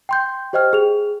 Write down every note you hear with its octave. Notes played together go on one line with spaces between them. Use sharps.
G5 C6 G6
G4 C5 D#5 G5 F6
G#4 F7